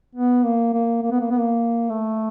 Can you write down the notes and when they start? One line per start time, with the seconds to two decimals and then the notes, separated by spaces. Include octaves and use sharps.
0.15 B3
0.45 A#3
0.74 A#3
1.02 A#3
1.11 B3
1.20 A#3
1.30 B3
1.39 A#3
1.89 A3